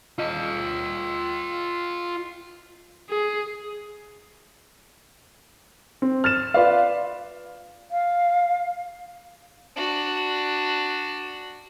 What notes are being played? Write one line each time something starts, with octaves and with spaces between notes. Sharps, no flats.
F4 D#5
G#4
C4
F6 A6 E7
F4 B4 D5 F5
F5
D4 F#4